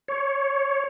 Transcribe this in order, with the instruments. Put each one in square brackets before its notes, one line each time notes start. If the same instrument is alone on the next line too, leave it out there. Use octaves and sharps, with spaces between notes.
[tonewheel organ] C#5